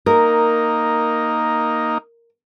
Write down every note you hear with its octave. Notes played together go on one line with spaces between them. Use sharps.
A#3 D#4 A#4